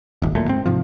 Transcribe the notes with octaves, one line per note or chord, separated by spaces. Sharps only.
D#1 G#1
D1 D#2 A#2 A3
G#2 C4
G#2 C3 F3